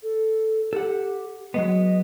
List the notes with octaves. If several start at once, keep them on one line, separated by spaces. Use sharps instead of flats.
A4
G4 A4 F#5
F#3 G#3 B3 D#5